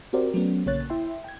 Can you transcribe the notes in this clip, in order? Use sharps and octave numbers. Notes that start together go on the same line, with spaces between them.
C4 F#4 G4 A#4 C5 D5
F#3 A3 B3 C#4
A#1 C#3 A#3 C#5 F#6 A6
E4 E5 G5 C6
G5 G#6